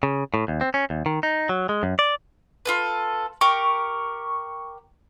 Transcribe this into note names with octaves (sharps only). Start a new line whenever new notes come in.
C#3
A2
D#2
C4
C#4
D#2
D#3
D#4
F#3
G#3
F#2
D5
F4 A4 B4
G4 A#4 C#6